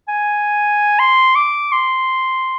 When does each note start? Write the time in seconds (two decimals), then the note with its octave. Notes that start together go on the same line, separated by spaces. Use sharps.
0.08 G#5
0.99 C6
1.35 D6
1.72 C6